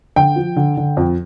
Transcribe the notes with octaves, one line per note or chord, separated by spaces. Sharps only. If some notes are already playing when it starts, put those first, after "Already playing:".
D3 G5
F3
D3
D3
F2